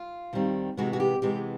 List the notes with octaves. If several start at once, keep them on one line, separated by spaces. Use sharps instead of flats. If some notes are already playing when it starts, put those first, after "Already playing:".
Already playing: F4
D#2 D#3 G3 C4
C3 E3 G#3 B3 F#4
F#4
G4
C3 E3 G#3 B3 G4